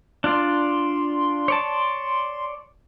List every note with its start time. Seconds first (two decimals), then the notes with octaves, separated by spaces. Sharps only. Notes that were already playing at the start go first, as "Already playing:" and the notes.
0.24 D4 F4 D5 C6
1.48 C#5 D5 A5